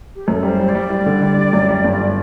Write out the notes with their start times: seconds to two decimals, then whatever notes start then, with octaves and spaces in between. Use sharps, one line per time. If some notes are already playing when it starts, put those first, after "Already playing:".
0.16 G4
0.27 F#2 A4 C5
0.43 G3
0.49 C5
0.59 G3
0.69 D5
0.75 G3
0.90 G3
1.06 D3
1.22 G3
1.37 G3
1.53 F#2
1.69 G3
1.84 G1